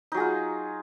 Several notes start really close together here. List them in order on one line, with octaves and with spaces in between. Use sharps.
D#4 F#3 G#4 F4